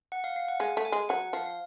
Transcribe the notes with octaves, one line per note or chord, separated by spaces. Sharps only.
F#5
F5
F5
F#5
G#3 G#5
A3
G#5
G#3
F#3 F#5
F3 F5
F5